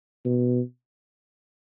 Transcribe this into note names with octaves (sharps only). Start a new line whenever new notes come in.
B2